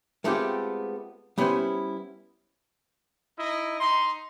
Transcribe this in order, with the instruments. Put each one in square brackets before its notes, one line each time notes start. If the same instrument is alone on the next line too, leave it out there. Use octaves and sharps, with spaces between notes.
[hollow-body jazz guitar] G#3 A3 B3 C4 F4 G4
G3 B3 C#4 E4 B4 C5
[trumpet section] D#4 E4 D#5
D#4 C6